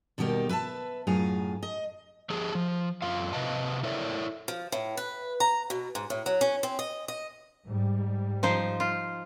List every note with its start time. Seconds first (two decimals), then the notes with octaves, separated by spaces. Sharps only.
0.18 D#2 B2 D#3 G3 G4 A#4
0.49 B4 E5 G#5 A5
1.07 F#2 A2 F4 G#4 A#5
1.63 D#5
2.30 F3 G4 G#4 A5
2.55 F3
3.02 F#2 F4 F5
3.33 C3 B4 D#5 F5 A5
3.83 E4 A4 A#4 C#5 D5 E5
4.48 F3
4.72 A2
4.97 B4
5.40 A#5
5.70 B2
5.95 G#2
6.10 A2
6.26 F#3
6.41 C#4
6.63 C4
6.79 D#5
7.08 D#5
7.67 G#2 G3
8.43 F3 D#4 C5
8.80 F4